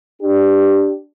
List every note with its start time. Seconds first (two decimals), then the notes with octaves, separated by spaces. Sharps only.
0.22 D4 G4